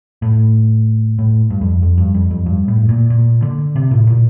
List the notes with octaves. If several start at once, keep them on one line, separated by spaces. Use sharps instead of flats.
A2
A2
G2
F2
F2
G2
F2
F2
G2
A2
A#2
A#2
D3
C3
A2
A#2